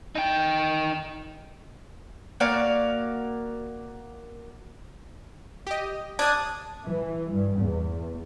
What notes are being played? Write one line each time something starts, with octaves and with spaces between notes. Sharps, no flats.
D#4 G5
A#3 F#4 D5 F5
G4 D#5
D4 D#6 G#6
E3
G2
E2